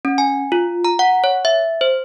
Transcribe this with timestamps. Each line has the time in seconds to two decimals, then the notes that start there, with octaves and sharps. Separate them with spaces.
0.05 C#4
0.18 G#5
0.52 F4
0.85 A#5
0.99 F#5
1.24 C#5
1.45 E5
1.81 C5